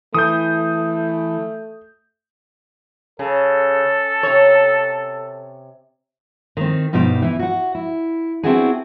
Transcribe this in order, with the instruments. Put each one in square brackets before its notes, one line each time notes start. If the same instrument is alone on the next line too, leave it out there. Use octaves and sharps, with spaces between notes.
[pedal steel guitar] E3 [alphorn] A3 [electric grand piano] D#6 G6
[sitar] C#3 [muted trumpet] A4
[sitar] C3 C#5
[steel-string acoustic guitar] D#3 C4
G2 B2 D#4 G4 C5
E3 E4
F#4 F#5
E4
B3 C4 D4 E4 F#4 G#4